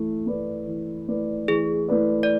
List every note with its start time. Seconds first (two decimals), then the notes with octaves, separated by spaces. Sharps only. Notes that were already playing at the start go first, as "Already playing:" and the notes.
Already playing: E3 A3 E4
0.26 A3 E4 B4 D5
0.67 E3
1.08 A3 E4 B4 D5
1.48 E3 G#4
1.88 A3 E4 B4 D5
2.23 D5